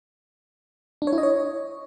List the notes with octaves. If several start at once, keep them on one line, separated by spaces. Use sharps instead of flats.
D4
C#5
E4
D#5
C#5